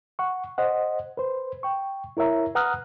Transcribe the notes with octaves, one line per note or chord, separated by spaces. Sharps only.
F#5 C#6
C5 D#5 F#5
B4 C5
G5 C#6
E4 A#4 C#5 E5 A#5
B4 F#5 A#5 D#6 F6 F#6